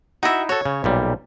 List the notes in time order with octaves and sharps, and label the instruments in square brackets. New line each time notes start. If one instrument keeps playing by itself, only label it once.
[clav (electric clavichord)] D#4 E4 [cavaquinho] F#4 E5
[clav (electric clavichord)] F#4 A4 [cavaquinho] C#5
[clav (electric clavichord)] C#3
B1 A#2 G3